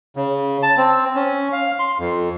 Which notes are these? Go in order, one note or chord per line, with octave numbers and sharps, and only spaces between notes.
C#3
A5
C4
C#4
F5
C6
F2